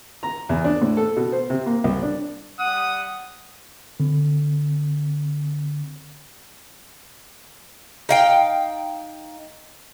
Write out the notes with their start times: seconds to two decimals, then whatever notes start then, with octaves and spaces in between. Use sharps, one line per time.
0.23 A#5
0.49 E2
0.64 D4
0.82 A2
0.97 A4
1.17 B2
1.32 C5
1.50 C3
1.66 A#3
1.84 C2
2.02 D4
2.59 G3 F#5 D#6
4.00 D3 C4
8.09 D#4 F5 G5